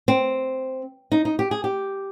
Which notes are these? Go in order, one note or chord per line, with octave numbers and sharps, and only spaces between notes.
C4
D#4
D#4
G4
G#4
G4